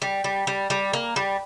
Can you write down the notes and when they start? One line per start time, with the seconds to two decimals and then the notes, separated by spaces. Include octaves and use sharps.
0.02 G3
0.24 G3
0.47 G3
0.70 G3
0.93 A#3
1.16 G3